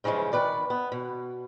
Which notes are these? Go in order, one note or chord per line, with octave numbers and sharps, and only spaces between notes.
G2 C#3 E3 F3 G#3
D#3 B4 D5
B3
B2